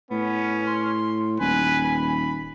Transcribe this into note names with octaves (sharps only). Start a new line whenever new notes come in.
A2 B3 C#4
C6
D#1 B4 G#5
B5